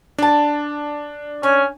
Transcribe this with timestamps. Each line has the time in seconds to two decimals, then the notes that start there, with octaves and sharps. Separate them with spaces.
0.18 D4 D5 A5
1.43 C#4 G#5